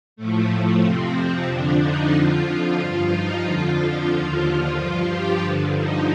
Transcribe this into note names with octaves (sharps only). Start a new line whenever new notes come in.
A2 F3 A3
F2 C3 F3 C4
F2 D3 F3 D4
D#4
F2 D3 F3 F4
G2 F3 F4
D#4
F2 D3 F3 F4
F4
D#2 D3 F3
G2 F3 F4
G4
G2 D3 F3
D#4